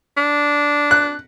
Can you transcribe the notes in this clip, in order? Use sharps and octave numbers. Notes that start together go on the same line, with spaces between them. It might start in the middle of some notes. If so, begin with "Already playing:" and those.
D4
F#6